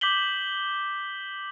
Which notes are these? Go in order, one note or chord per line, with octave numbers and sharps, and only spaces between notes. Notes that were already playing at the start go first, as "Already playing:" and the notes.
D6 G6 B6 F#7 G7